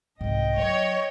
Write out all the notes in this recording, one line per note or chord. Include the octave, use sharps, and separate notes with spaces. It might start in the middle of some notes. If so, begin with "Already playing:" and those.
C2 G#2 D#5 G5
F#3 C#5